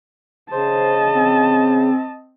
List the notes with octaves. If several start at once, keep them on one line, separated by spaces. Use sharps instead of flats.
C#3 C5 D#5 A5
C4